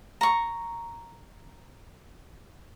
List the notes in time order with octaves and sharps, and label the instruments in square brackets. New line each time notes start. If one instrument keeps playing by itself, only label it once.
[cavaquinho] A#5 C#6